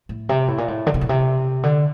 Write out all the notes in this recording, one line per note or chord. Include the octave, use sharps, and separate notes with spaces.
A2
C3
A2
A#2
A2
D3
C3
A#2
C3
D3